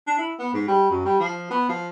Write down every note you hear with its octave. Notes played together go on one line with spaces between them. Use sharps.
D4
E4
B3
G#2
G3
F#2
G3
F3
B3
F3